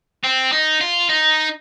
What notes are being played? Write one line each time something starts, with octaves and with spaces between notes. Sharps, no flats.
C4
D#4
F4
D#4